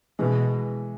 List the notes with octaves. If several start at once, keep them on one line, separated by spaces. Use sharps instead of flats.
B2 E3 G#3